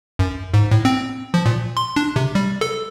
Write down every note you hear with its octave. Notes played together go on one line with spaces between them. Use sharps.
F#2
G#2
A2
C4
F3
A#2
C6
D4
C3
G3
A4